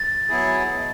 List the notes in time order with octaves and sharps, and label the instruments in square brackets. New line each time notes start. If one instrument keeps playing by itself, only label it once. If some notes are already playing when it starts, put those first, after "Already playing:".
Already playing: [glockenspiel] A6
[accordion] F#3 B3 E4 G#4
B2